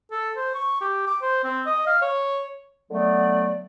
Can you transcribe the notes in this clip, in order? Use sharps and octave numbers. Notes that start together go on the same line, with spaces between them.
A4
C5
C#6
G4
D6
C5
C4
D#5
F5
C#5
D3 F#3 A3 B3 D5